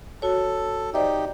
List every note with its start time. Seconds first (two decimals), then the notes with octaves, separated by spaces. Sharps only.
0.22 F#4 A4 C#5
0.94 D#4 G4 C5 D5 E5